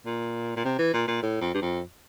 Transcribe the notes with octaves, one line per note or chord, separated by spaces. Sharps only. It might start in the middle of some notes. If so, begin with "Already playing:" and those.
A#2
A#2
C3
E3
A#2
A#2
A2
F2
G2
F2